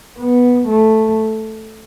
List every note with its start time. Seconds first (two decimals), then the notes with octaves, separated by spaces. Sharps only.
0.18 B3
0.68 A3